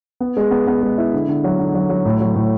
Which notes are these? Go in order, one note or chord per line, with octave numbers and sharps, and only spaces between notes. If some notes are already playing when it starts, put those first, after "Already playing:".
B3
G#3
B3
B3
G#3
E4
D3
D3
F#3
D3
F#3
F#3
A2
F#3
A2